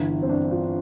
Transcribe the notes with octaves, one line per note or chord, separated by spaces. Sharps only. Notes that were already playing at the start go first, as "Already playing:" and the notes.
Already playing: G1 G2 E3
C4
D4
F4